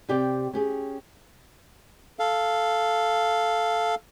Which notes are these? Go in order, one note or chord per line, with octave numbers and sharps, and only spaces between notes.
C3 G4 D5 G5
C#4 G4 G#4
A4 F5